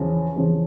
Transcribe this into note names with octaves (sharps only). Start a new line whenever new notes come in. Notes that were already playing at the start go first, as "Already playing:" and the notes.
Already playing: E2 C#3 F3
E2 C#3 F3